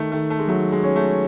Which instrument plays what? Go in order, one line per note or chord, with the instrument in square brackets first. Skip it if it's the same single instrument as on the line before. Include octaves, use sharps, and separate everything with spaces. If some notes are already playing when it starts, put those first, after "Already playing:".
Already playing: [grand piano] D#3 [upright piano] A3
[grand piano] D#3 [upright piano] A3
[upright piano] A3
G#3
[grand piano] F#3 [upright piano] A3
[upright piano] G#3
[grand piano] C#4
[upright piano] A3